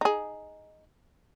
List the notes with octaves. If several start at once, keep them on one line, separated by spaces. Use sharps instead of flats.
D#4 G#4